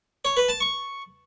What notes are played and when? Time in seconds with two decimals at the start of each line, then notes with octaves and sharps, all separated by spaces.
0.25 C#5
0.37 B4
0.49 A5
0.60 C#6